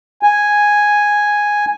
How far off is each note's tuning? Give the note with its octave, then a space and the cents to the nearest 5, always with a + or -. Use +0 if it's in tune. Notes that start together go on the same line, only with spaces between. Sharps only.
G#5 +0